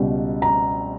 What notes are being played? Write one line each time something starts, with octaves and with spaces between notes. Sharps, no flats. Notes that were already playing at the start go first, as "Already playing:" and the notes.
Already playing: C#2 B2 G3
A#5